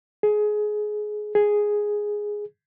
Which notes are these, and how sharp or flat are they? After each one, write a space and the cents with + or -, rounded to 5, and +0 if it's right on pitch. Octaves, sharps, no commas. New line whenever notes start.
G#4 +20
G#4 +0